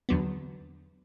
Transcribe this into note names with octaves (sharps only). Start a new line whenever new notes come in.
E2 D3 F#3 B3